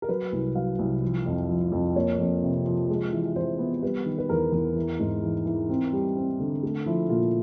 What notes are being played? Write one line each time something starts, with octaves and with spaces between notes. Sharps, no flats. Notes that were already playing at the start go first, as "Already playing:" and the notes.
A#4
F#3 B4
C2
F#3 F5
C2
F3
F2
F3
F2
A#3 C#5
F2
C3
F3
G#3
E3
E3 C5
B3
G3 B4
D#3
B4
E2 A#4
E2
E3
G#2
E3
E3
C4
G3
C4
D3
A3
F3 E4
A#2 F4